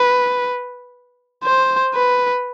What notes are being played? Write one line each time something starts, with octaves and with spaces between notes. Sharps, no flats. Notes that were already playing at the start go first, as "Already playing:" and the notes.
Already playing: B4
C5
B4